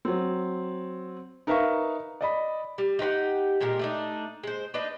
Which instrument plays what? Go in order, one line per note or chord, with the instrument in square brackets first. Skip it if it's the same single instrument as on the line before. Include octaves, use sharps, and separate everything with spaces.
[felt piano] F#3 C4
D#4 A#4 B4 E5 F5 C#6
D5 D#5 B5
[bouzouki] G3
D#4 G4 B4 F#5
A#2 G#3 G4 A#4
A3 D4 D#4
G#3 C5
D4 D#4 B4 D#5